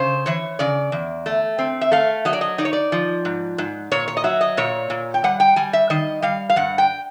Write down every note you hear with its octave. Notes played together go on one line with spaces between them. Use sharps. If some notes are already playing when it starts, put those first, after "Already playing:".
Already playing: C#3 C5
E3 C#5
C#3 D5
E2
A3
C4
E5
A3 F5
F#3 D#5
D5
D#5
D#4 D5
C#5
D5
F3
G#2
G#2
A#2 C#5
C#5
D#5
F#3 E5
D#5
A#2 C#5
A#2
G5
G3 F#5
G5
G3 G#5
E5
D#3 D#5
G3 F5
F5
G2 F#5
G5